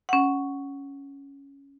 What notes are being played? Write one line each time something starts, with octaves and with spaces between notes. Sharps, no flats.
C#4 F#5